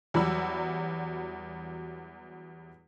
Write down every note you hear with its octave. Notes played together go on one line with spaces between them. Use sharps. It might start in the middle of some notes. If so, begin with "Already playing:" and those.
E2 F#3 G3 F#4 B5 E6